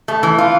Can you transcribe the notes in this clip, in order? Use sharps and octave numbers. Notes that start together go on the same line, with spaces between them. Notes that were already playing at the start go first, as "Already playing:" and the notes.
A3
E3
F4